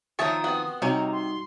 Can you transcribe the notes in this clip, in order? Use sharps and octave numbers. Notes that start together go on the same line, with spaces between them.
D#3 F3 A#3 C#5 E5 A5 C#6 D#6
B3 C4 F#4
C3 D#3 G3 D#4 F#4 C#5 G#5 A#5
C6